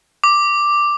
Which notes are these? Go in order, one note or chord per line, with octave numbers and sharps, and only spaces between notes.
D6